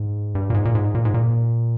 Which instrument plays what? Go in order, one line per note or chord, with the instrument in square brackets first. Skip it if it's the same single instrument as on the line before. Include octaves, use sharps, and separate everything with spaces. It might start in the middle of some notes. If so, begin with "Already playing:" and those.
Already playing: [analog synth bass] G#2
G2
A#2
G#2
A#2
G#2
A#2
G#2
A#2